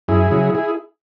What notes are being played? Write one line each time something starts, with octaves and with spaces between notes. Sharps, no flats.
F#2 E4 G#4
C#3 F#3
E4 G#4